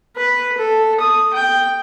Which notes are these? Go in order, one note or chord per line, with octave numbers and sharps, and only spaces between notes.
B4
A4
D#6
G5